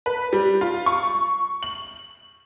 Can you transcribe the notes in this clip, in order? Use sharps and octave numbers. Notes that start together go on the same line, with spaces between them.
B4
G3
F4
C#6
F#7